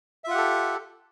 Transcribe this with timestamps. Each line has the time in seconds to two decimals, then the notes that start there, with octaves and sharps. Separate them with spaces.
0.24 E5
0.27 F4
0.31 F#5
0.34 G4
0.37 A4